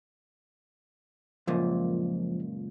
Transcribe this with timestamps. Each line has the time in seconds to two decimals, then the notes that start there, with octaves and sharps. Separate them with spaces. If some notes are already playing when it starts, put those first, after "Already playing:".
1.47 C#2 F#2 A#2 F3